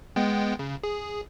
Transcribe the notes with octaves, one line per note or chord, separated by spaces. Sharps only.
G#3 B3 G5
C#3
G#4